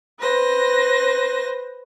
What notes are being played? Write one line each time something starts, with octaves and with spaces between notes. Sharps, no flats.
B4 C5 A#6